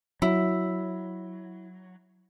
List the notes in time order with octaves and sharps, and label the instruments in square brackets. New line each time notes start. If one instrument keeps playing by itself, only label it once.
[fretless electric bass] F#3 [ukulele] E4